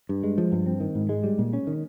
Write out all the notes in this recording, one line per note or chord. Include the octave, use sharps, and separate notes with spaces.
G2
G#3
F3
G2
C4
D#3
G#2
G#3
G3
A#2
C#4
D#3